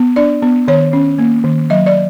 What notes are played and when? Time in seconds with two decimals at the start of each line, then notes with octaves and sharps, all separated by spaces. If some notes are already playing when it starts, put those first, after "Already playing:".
Already playing: B3
0.16 D4 D5
0.42 B3
0.68 D#3 C#5
0.93 C#4
1.19 A#3
1.44 D#3
1.70 F#3 D#5
1.86 D5